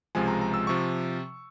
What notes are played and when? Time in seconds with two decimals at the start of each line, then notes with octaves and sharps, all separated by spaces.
0.15 C#2 C3 F3 G#3 G#5
0.28 A#5
0.41 A#5
0.54 E6
0.67 C3 F3 C#6